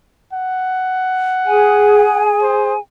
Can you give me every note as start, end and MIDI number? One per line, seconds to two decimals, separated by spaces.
0.34 2.25 78
1.46 2.76 68
1.46 2.79 80
2.42 2.75 72